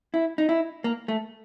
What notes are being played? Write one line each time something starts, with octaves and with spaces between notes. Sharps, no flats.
E4
D#4
E4
A#3
A3